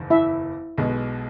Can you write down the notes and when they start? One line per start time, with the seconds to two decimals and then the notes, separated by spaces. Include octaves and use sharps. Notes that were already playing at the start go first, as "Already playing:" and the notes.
Already playing: F#1 E2 D#3
0.10 E4 E5
0.78 B1 B2 G#3 B3